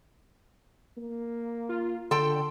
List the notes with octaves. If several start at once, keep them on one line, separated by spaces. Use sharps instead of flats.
A#3
F4
D3 A4 G5 C6